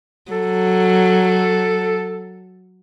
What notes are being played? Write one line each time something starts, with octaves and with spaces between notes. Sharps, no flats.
F#3 A4